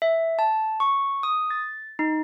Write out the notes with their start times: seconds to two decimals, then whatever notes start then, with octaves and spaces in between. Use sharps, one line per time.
0.02 E5
0.39 A5
0.80 C#6
1.23 D#6
1.50 A6
1.99 D#4